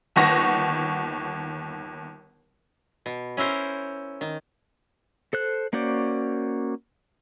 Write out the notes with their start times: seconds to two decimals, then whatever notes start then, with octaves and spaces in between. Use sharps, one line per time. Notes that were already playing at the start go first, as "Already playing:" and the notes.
0.16 G1 D#2 F#5 C#6 A#6
3.06 B2
3.37 C#4 E4 A#4 C5
4.21 D#3
5.33 A4 C5 F#6
5.73 A#3 C#4 F#4 C5 D5